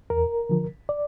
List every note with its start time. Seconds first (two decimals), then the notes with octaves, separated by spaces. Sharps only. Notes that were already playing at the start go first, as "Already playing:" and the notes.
0.10 E2 A#4
0.49 D3 F3
0.89 D5